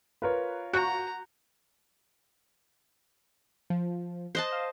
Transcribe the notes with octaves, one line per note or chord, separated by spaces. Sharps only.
F4 A#4 B4 C#5
F#4 A#5 F#6 G6 C#7
F3
C5 D#5 A5 F#6
F5